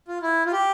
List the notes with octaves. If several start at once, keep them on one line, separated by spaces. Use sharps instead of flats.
F4
E4
F4
G4